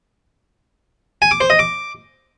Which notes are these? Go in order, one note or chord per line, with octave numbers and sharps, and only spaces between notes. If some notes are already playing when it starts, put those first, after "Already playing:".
G#5
D6
C5
D#5
D6